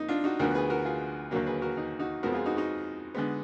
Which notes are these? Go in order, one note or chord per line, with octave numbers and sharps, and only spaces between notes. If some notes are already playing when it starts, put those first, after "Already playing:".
Already playing: F2 A#3 D#4
D4 F4
D#4 F#4
D2 D3 F3 B3 F#4 A#4
G#4 B4
F#4 A#4
F4 G#4
D#2 D3 F#3 A#3 F#4 A#4
G#4 B4
F#4 A#4
D#4
D#4 F#4
F2 F3 G#3 B3 F#4 A#4
F4 G#4
D#4 F#4
D#4 F#4
D3 G#3 B3